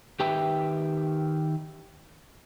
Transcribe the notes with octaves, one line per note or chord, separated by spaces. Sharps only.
D#3 G4 B4 E5 G5